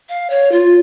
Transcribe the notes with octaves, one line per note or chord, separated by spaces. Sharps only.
F5
C#5
F4